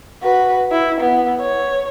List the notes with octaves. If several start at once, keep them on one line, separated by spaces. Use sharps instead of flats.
F#4 B4
E4
B3
C#5